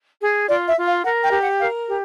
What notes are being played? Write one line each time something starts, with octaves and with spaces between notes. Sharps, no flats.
G#4
F4 D5
E5
F4
F5
A#4 F#5
G5
G4
F#5
A#4 F5
G4